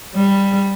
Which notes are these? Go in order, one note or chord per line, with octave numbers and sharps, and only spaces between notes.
G3